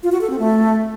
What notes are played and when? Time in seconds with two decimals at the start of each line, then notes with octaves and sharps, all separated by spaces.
0.03 F4
0.12 F#4
0.21 A4
0.30 C4
0.39 A3